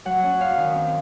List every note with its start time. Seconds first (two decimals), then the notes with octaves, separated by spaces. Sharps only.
0.05 F#3 F#5
0.23 C#4
0.40 F#2 F5
0.58 D#3
0.75 C4